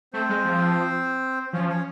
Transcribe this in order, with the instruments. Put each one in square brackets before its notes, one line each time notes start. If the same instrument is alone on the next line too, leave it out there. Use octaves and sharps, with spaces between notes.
[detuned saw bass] A3 [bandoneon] C4 C5
[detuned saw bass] G#3
F3
[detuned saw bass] F3 [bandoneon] C#4 C#5
[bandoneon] C#4 C#5